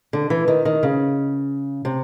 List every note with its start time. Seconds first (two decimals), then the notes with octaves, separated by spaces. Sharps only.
0.13 D3
0.30 E3
0.48 D#3
0.65 D#3
0.83 C#3
1.85 C3